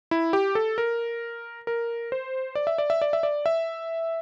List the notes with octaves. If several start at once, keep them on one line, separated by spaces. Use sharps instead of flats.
E4
G4
A4
A#4
A#4
C5
D5
E5
D5
E5
D5
E5
D5
E5